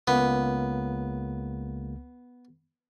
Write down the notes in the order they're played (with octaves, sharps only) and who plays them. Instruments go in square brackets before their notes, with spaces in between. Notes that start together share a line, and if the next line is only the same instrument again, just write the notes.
[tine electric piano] C#2 A#3 [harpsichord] B3